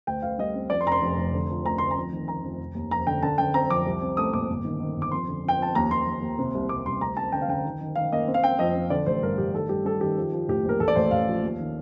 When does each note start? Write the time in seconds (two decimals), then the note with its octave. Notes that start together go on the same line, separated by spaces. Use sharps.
0.07 D2 G5
0.22 D2 F5
0.38 G3 D#5
0.55 C4
0.70 F2 D5
0.81 C6
0.87 F1 A#5
0.92 C6
1.02 F1
1.18 F1
1.33 D3
1.50 F3
1.65 D2 A#5
1.78 D2 C6
1.91 A#5
1.97 F2
2.12 D#3
2.28 F2 A#5
2.44 F2
2.60 F1
2.75 D#2
2.91 F1 A#5
3.07 D3 G5
3.23 D3 A5
3.38 D3 G5
3.54 C4 A#5
3.70 F2 D6
3.86 C2
4.02 C4
4.17 A3 D#6
4.33 A#2 D6
4.50 G1
4.65 D#3
4.80 D#3
4.96 G1
5.02 D6
5.12 F2 C6
5.28 D3
5.44 F2 G5
5.59 F2 A5
5.75 D#2 A#5
5.91 D#2 C6
6.07 D#2
6.22 D#2
6.39 C3
6.55 C2
6.69 C2 D6
6.86 C2 C6
7.01 D2 A#5
7.17 C4 A5
7.32 D3 G5
7.42 F5
7.48 D3 G5
7.65 D#3
7.81 D#3
7.96 D#3 F5
8.12 A#3 D#5
8.28 C4
8.34 F5
8.43 C4 G5
8.59 F2 D#5
8.75 F2
8.90 D3 D5
9.06 A1 C5
9.22 G2 A#4
9.38 A1 G4
9.54 D#3 A4
9.69 G2 G4
9.85 G3 A4
10.01 D#3 G4
10.17 F3
10.32 F3
10.48 A2 G4
10.65 A#1 A#4
10.80 A1 A4
10.88 D5
10.95 A1 C5
11.11 A1 F5
11.27 F3
11.43 D#2
11.59 D#3